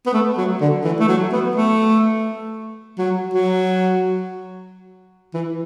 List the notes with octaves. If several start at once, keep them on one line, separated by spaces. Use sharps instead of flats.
B3
A3
F#3
D3
E3
A3
F#3
B3
A3
F#3
F#3
E3